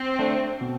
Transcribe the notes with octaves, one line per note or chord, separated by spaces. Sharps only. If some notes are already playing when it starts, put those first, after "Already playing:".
Already playing: C4
A3 D4
B2